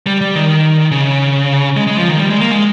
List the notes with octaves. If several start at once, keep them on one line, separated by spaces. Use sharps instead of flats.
G3
G3
D#3
C#3
G#3
G#3
F3
D#3
G3
G#3
A#3
G#3